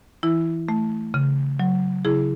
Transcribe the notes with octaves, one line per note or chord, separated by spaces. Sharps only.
E3 E4
A3
C#3
F#3
C#3 E4 G#4